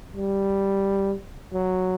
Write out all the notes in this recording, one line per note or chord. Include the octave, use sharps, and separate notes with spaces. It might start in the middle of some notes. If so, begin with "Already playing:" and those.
G3
F#3